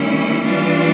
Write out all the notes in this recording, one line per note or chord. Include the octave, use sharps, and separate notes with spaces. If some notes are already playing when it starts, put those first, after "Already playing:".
Already playing: D#3 G3 A#3 C#4 E4
E3 G3 A#3 D4 F4